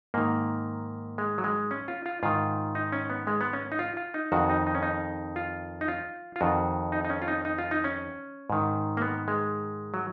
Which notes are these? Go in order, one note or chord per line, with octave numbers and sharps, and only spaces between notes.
G#2 D#3 A#3
G#3
F#3
G#3
C#4
F4
F4
G#2 D#3 F4
D#4
C#4
B3
G#3
B3
C#4
D#4
F4
F4
D#4
F2 D#3 F#4
D#4
D#4
C#4
D#4
F4
D#4
F4
F4
F2 D#3 F#4
D#4
D#4
C#4
F4
D#4
D#4
F4
D#4
C#4
G#2 D#3
A#3
B3
G#3
F#3